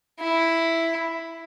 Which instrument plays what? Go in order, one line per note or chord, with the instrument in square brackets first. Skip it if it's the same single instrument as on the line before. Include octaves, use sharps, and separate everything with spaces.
[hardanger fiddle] E4